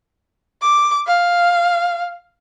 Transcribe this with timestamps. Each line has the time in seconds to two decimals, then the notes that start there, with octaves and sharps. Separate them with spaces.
0.62 D6
1.07 F5